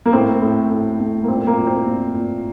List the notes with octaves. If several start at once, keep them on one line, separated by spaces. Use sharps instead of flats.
A#3
A2 C4
A2
A2
A2
A#3
A#2 C4
A#3
A#2
C4
A#2
A#2